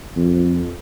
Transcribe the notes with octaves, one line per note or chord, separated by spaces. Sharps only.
F2